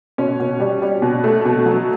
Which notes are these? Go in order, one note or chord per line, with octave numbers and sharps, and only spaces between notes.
B2 C#4
B2
G3
G3
B2
A3
B2
F#3